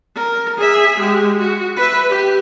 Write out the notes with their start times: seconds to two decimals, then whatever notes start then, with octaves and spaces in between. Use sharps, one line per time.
0.16 A#4
0.58 G#4 E5
0.99 G#3 G4
1.38 F#4
1.76 B4 E5
2.09 G4